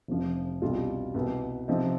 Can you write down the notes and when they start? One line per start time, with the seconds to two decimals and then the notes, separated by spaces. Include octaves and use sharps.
0.08 F1 F2 C3 F3
0.62 C2 B2 G3 D4 F4
1.14 C2 B2 B3
1.68 C3 F3 C4 D#4